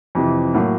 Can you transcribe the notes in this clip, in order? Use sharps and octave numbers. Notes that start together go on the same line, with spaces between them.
F2 C3 E3
A2 F#3 A#3